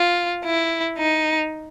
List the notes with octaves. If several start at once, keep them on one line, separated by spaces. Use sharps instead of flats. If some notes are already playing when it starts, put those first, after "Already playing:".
Already playing: F4
E4
D#4